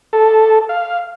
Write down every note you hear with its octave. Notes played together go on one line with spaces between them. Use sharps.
A4
F5